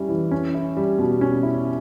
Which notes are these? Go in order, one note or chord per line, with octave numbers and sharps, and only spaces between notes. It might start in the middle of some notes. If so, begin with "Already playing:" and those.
Already playing: G3 C#4 E4
E3
C#4
E4
G3
B2
C#4
E4